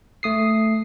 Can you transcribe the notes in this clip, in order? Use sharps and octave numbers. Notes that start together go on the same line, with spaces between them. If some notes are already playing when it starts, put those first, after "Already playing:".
A3 D#6 C7